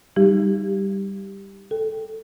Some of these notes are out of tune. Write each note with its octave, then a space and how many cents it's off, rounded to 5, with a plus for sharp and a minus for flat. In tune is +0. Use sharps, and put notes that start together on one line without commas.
G3 +0 D#4 +0 G4 +0
A4 +0 G5 +0